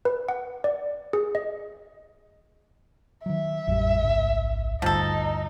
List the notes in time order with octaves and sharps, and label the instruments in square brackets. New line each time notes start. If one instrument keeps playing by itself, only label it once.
[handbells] B4
F#5
D5
G#4
D#5
[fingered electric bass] D#3 F#3 [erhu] E5
[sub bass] A1 [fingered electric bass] F2 A2 G3
[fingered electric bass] C#2 G#2
[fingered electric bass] D2 G2 [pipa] F3 A4 [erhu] D#4